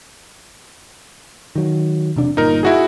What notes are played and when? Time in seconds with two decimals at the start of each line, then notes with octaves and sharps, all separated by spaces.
1.56 D#3 F#3
2.16 E1 C3 D4
2.37 G1 A#2 D#4 A#4
2.63 E4 F#4 G#4